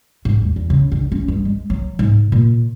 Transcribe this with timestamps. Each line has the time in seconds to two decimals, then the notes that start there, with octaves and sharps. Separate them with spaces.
0.25 G#2
0.42 E2
0.56 E2
0.70 C#3
0.92 D3
1.12 C#4
1.28 G2
1.45 G#3
1.70 F#3
1.99 G#2
2.32 A#2